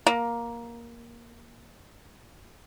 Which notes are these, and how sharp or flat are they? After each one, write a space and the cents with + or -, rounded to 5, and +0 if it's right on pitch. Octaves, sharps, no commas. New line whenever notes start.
A#3 +10